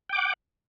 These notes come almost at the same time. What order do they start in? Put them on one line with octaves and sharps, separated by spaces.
G5 D6 F#5